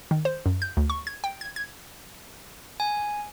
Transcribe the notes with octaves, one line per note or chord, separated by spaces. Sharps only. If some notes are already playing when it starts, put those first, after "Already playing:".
D#3
C5
F#2
G6
D2
C#6
G#6
G5
G#6
G#6
G#5